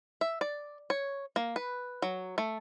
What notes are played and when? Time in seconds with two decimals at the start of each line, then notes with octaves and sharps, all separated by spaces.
0.21 E5
0.41 D5
0.90 C#5
1.36 A#3
1.56 B4
2.02 F#3
2.38 A3